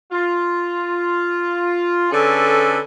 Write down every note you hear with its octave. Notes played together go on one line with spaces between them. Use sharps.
F4
D3 C#4 G#4 A4 B4